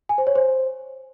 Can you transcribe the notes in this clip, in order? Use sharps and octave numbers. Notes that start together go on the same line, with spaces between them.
G#5
C5
C#5
C5